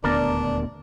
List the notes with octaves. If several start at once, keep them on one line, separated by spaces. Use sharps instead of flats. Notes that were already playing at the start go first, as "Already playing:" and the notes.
D#1 D2 B3 D4 A#4 D5